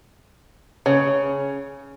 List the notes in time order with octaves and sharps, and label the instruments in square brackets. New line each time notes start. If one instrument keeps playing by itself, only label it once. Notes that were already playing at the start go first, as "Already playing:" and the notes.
[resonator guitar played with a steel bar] C#3 [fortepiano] C#5